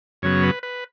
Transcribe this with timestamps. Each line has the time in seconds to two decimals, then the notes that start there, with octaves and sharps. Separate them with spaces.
0.22 F#2 C#3 F#3 B3 C#5
0.43 B4
0.63 B4